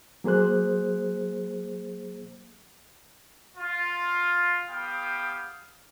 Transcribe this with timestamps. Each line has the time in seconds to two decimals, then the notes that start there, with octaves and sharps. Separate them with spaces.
0.24 F#3 A#3 G#4 C5 F#6
3.57 F4
4.69 B3 G4 F5 G5 D#6